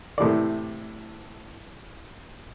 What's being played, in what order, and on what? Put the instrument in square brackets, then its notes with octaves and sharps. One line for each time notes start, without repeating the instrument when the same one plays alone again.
[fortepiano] A2 C3 E3 D5